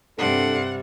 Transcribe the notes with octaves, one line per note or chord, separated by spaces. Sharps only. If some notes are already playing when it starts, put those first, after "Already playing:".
G2 C3 G3 C4 D4 A4 F#5